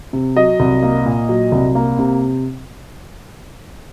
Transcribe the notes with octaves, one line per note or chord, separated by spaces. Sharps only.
C3
F#3 D#5
C2
A#3
A#2
F#3
C2
A#3
C3